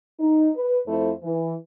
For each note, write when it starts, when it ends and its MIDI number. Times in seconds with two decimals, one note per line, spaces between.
0.19 0.49 63
0.55 0.79 71
0.87 1.11 41
0.87 1.11 57
0.87 1.11 64
0.87 1.11 72
1.23 1.54 52